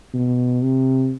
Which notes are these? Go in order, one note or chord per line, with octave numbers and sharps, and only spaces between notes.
B2
C3